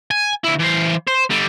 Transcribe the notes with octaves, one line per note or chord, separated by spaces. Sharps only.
G#5
D2 E4
E3 C5
C5
D3 G3